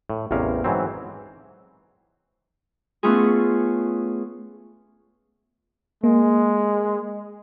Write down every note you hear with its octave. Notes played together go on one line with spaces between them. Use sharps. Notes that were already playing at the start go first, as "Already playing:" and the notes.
A2
A1 E2 C3 C#4 A#4 F5
G#2 E3 F#3 C4
A3 B3 C#4 F4 G#4
G#3 A#3